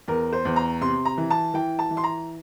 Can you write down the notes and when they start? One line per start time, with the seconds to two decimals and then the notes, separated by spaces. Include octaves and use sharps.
0.08 E2 A#4
0.33 C5
0.45 E2
0.56 A#5
0.81 C3 C6
1.05 A#5
1.17 E3
1.31 A5
1.54 E3 G5
1.79 A5
1.90 E3
1.97 C6
2.04 A#5